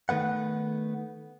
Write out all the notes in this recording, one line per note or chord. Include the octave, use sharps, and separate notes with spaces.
D#3 A3 B3 F#5